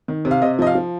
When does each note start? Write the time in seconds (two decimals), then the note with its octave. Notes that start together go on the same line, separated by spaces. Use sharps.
0.08 D#3
0.25 C3
0.31 F5
0.42 C3 D#5
0.59 F3 D#5
0.67 F5
0.75 F3